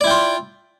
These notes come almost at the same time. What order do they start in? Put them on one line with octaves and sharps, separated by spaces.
D5 E4 G5 F4